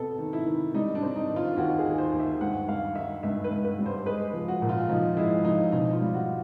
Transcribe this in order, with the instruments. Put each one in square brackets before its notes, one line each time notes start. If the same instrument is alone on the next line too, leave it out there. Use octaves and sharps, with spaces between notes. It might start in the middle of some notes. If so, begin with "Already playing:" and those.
Already playing: [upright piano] C3 B3 A4
D#3
E4
D#3
G3 D#4
D4
C4
D#4
D#3
F4
D#2 F#4
G#4
D#3
C5
D#2
E5
G2 F#5
G3 F5
D#3 E5
G2 E5
B4
G2
B4
G3
C5
G#3 B4
F3
F#4
A#2
F4
F3 D#4
G#3 E4
F3 D#4
B2 D#4
F4
G3
F#4